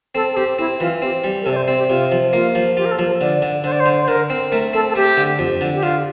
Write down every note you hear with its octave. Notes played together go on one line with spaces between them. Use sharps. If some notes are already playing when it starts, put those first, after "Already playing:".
C4 A4
A4
C4 G4
C4 E4
E3 F4
C4 G4
G3 G4
A#4
C3 A4
D5
C5
C4 D5
G4
C3 F4
F3
A#3 F4
F3
F4 G4
A#4
A4
F3
A#4
D3 D5
D3
D3 C5
D5
C5
D3
C5
D3 A#4
C4
A3 A#4
C4 A4
A4
A3 G4
D3
F2
D3
G4
D3 F4